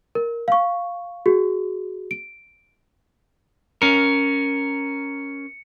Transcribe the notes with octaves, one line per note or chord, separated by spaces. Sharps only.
A#4
F5 C#6
F#4 G#4
D7
C#4 A#4 C#7